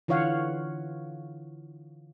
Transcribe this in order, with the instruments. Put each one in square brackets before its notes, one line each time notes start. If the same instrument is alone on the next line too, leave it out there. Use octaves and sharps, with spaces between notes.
[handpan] D3 E3 F4 C#5 F5 F#5